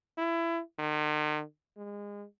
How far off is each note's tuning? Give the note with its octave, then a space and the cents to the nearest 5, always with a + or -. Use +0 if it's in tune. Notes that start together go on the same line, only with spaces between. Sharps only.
E4 +25
D#3 -45
G#3 -25